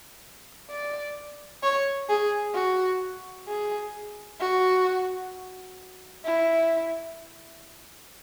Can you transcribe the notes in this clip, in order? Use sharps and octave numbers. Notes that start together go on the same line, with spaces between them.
D5
C#5
G#4
F#4
G#4
F#4
E4